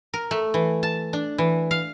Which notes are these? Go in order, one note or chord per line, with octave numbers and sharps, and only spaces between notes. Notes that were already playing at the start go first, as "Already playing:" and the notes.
A#4
A3
E3
A5
D4
E3
F5